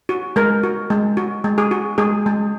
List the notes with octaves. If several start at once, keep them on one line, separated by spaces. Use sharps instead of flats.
F#4
G#3 A#4
F#4
G#3
F#4
G#3
G#4
F#4
G#3 G#4
G#3